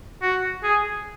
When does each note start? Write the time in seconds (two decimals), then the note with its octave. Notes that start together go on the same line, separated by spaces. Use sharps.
0.22 F#4
0.63 G#4